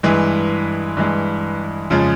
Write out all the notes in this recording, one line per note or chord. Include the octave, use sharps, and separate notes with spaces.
G2 E3 G#3
G2 E3 G#3
F2 C#3 F3 G#3